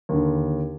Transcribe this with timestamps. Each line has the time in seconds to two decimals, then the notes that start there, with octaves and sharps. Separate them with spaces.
0.09 D#2 D3